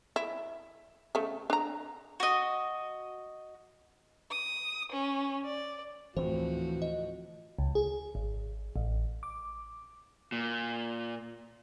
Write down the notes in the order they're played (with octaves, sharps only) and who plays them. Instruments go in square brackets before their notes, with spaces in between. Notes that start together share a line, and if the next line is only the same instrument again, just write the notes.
[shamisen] E4
C#3 A3
D4 A#5
[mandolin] F#4 D#5
[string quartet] D#6
C#4
D5
[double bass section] D2 A2 [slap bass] E3 C4 [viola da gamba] F3 F#4 [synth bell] C5
[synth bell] D#5
[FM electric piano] C#2
G#4
G#1
A1
D6
[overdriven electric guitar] A#2